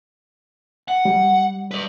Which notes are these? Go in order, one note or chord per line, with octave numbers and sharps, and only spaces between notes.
F#5
G3
B4 D5